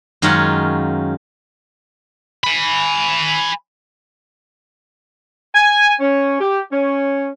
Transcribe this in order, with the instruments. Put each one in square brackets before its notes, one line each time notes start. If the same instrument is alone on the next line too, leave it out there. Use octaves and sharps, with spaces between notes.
[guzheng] F#2 D#3 G#3 C#4 F4 F#5
[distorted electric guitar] G#5 B5
[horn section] G#5
C#4
G4
C#4